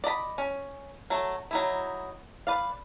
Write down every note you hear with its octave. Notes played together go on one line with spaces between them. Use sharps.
D5 D#5 A#5 B5
C#4
F#3 A3
F#3 D#4 E4
B4 D5 F5